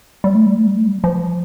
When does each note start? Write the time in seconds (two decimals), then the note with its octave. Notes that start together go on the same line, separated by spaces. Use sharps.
0.24 G3
0.35 A3
0.46 G3
0.56 A3
0.67 G3
0.77 A3
0.87 G3
1.04 F3